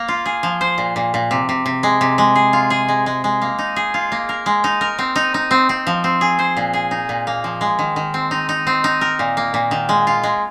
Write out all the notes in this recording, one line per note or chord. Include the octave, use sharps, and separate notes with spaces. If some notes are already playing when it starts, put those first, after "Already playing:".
Already playing: A#3
F4
G#4
F3
C5
A#2
A#2
A#2
C3
C3
C3
G#3
C3
G#3
G#4
F4
G#4
G#3
G#3
G#3
A#3
D#4
G#4
F4
A#3
A#4
G#3
D#4
A#4
C4
D#4
D#4
C4
C4
F3
C4
G#4
C5
A#2
G#4
D#4
A#2
A#3
F3
G#3
D#3
D#3
C4
D#4
D#4
C4
D#4
A#4
A#2
A#3
A#2
D#3
G#3
F4
G#3